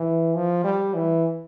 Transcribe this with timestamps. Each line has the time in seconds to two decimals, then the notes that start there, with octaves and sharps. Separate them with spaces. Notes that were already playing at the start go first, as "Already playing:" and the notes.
Already playing: E3
0.35 F3
0.64 G3
0.94 E3